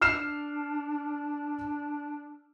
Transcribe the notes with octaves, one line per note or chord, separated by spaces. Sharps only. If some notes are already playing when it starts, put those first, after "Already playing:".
D4 F6 C7 E7